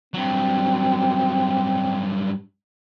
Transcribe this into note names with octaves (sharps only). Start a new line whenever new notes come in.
G2 F#3 C4